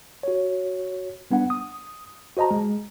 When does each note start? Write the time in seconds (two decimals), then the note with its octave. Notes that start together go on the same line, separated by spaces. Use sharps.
0.23 F#4 C#5
1.31 G3 B3 D4 F#5
1.50 D#6
2.37 F#4 C5 D#5 A5 A#5
2.51 G#3